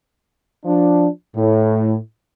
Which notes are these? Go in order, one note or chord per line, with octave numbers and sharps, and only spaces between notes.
F3 D4
A2